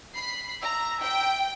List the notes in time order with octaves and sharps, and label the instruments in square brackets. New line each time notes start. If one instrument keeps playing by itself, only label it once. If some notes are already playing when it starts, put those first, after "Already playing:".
[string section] B5 C7
[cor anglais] E5 [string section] A#5
[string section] G5